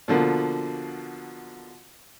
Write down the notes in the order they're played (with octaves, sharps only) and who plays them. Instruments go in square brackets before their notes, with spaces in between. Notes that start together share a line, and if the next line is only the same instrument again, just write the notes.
[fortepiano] B2 D3 F3 A#3